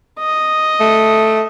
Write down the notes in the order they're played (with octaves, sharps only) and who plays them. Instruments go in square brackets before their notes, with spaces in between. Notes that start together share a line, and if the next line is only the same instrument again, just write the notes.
[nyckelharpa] D#5
[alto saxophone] A3